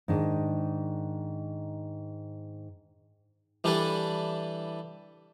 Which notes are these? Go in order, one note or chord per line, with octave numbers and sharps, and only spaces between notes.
G#2 D#3 D4
E3 G3 D4 E4 A4 B4